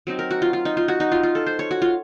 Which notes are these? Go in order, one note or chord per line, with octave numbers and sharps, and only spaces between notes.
F#3 C4 D#4
A#4
F#4
F4
F4
D#4
F4
F#4
D#4
F4
F4
A4
C5
C#5
F#4
F4